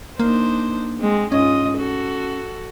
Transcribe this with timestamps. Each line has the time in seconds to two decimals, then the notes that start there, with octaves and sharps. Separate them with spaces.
0.19 A#3 D4 D#4 C5
0.99 G#3 C4
1.32 G#2 C#4 F4 D#5
1.77 F#4 A4